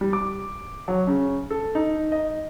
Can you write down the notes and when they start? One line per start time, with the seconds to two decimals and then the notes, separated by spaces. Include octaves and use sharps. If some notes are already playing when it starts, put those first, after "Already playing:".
0.01 G3
0.13 D6
0.88 F#3
1.07 C#3
1.51 A4
1.75 D#4
2.12 D#5